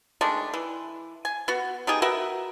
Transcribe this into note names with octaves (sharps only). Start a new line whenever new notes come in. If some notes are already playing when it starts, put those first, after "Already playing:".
D#3 G#3 A3 D4
E3
G#5
B3 F#4
B3 D#4 G4 G#4
F#4 A#4 B4 E5